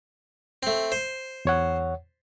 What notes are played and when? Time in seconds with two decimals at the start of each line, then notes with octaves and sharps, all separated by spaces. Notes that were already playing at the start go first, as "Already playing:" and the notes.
0.63 A3 C4
0.92 C5
1.45 E2 C#5 F#5